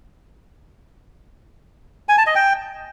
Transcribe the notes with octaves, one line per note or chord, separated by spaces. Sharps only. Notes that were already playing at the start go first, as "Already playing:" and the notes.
G#5
A5
D#5
G5